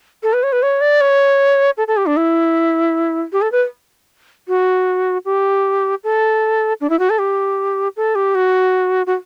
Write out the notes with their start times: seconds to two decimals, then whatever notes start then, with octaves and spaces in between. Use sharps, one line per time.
0.23 A4
0.33 B4
0.43 C#5
0.52 B4
0.62 C#5
0.81 D5
1.01 C#5
1.77 A4
1.88 A4
1.97 G4
2.06 D4
2.17 E4
3.32 G4
3.42 A4
3.52 B4
4.48 F#4
5.25 G4
6.04 A4
6.81 D4
6.90 E4
6.99 F#4
7.10 A4
7.19 G4
7.96 A4
8.15 G4
8.35 F#4
9.06 F#4